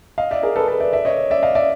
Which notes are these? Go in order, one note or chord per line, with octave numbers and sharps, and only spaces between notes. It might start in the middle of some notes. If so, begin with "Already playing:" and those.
D#5 F5
D5 E5
G#4 A#4
A4 B4
A4 B4
D5 E5
D5 E5
C#5 D#5
D5 E5
D#5 F5
D5 E5